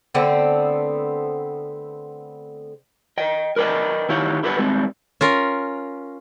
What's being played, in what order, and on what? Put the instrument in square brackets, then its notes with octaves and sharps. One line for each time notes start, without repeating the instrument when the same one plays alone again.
[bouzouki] D3 A3 B3 C4
[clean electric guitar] D#5 G5
A#4 B4 D5 D#5 G5
D#3 E4 G4 C#5 F5 F#5
E4 G4 A4 B4 E5 F#5
G3 G#3 C4
[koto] C#4 F4 A#4